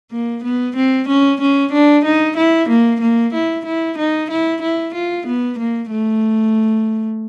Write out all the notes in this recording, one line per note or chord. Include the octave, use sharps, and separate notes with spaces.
A#3
B3
C4
C#4
C#4
D4
D#4
E4
A#3
A#3
E4
E4
D#4
E4
E4
F4
B3
A#3
A3